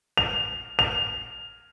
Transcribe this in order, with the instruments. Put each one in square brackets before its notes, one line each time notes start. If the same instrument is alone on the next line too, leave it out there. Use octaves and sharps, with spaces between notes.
[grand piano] F7
F7